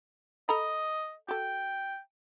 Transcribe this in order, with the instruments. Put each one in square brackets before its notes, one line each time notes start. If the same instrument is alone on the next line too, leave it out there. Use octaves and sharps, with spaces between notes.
[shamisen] A4 A#5 B5 [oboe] D#5
[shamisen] F#4 A4 [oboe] G5